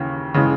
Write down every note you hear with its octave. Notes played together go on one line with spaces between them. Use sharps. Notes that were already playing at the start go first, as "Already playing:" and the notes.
Already playing: D#2 C#3 E3
C#3 E3 G#3